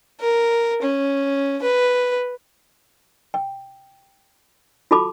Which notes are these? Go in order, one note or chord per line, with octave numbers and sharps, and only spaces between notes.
A#4
C#4
B4
G5
F4 F#4 A4 A5 B5 D6